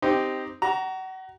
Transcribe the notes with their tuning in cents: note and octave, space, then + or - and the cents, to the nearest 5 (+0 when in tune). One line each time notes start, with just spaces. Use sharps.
C4 -10 D#4 +0 G4 +0
F#4 +30 A#5 +0